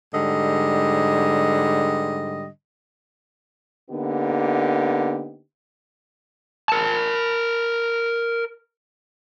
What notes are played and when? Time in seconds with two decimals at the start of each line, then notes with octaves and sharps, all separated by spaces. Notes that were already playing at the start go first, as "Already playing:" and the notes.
0.14 G#2 D3 G3 D#5
3.90 D3 A#3 B3 D#4 G4
6.70 A#4 A5